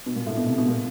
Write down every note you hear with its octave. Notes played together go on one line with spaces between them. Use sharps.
B2
A#2
A2
B2
C3
B2
A#2